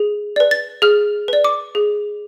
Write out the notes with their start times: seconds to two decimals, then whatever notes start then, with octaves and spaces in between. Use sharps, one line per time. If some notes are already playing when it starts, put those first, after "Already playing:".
Already playing: G#4
0.36 B4 D5
0.51 A6
0.82 G#4 F6
1.28 B4 D5
1.44 D6
1.75 G#4